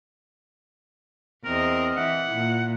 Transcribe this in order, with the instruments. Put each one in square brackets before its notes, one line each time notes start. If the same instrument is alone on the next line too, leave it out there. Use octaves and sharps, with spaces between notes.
[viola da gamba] E2 C4 D#5 [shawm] A#4
[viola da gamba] E3 E4 [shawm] F#5
[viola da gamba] A#2